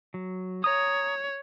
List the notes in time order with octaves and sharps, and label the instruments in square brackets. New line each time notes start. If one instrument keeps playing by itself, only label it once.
[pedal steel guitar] F#3
[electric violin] C#5 [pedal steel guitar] A#5 D#6